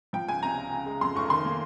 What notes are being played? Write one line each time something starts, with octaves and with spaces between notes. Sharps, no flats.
F3 G5
C#2 G#5
C3 A#5
C#2
C#3
G#3
F2 C6
F1 C#6
D#3 C6
A#3